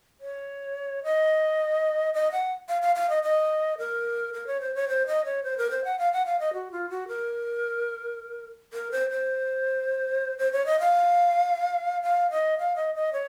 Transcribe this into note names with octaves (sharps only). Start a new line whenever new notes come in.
C#5
D#5
D#5
F#5
F5
F5
F5
D#5
D#5
A#4
A#4
C#5
C5
C#5
C5
D#5
C#5
C5
A#4
C5
F#5
F5
F#5
F5
D#5
F#4
F4
F#4
A#4
A#4
C5
C5
C5
C#5
D#5
F5
F5
D#5
F5
D#5
D#5
C#5